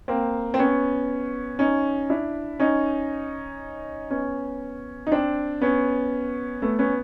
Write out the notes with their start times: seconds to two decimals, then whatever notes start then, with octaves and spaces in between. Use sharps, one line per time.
0.08 A#3 C4
0.54 C4
0.59 B3 C#4
1.59 C#4 D#4
2.10 D4 E4
2.60 C#4 D#4
4.10 B3 C#4
5.07 D#4
5.12 C4 D4
5.61 B3 C#4
6.62 A3 B3
6.79 B3 C#4